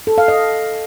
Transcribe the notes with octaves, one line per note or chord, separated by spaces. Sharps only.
A4
F5
D#5